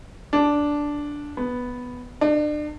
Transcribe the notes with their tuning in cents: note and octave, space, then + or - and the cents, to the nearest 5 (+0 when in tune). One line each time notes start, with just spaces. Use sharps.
D4 -5
B3 +0
D4 +35